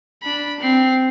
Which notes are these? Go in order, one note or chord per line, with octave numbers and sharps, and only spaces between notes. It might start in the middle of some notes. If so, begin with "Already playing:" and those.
D4 B5
C4 C7